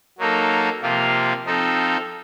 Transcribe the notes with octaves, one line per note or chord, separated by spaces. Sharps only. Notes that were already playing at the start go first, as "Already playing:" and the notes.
F#3 A#3 D#4 A4
C3 F3 A#3 F4
F3 C4 D#4 A4